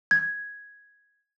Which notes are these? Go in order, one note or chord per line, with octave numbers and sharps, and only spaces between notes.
G#6